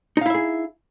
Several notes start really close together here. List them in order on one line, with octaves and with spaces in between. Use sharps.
D#4 F5 E4 E5 G#4